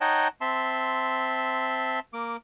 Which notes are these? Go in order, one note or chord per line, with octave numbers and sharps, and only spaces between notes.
D#4 C#5 D#5 F#5 G5 A5
C4 E5 A5 C6
A#3 D6